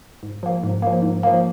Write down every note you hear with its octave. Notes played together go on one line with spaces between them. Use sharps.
G#2
F3 A#3
G#2
F3 A#3
G#2
F3 A#3